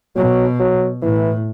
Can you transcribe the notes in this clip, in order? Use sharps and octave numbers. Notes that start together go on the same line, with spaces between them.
B2 F#3
F#3
A2 E3